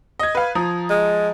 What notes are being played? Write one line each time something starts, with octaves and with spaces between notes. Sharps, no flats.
D#5 G#6
B4 F5
F3 A#5 D#6
G#3